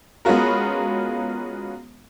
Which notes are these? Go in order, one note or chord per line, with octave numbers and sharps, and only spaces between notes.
G#3 B3 C#4 F4 F#4 A#4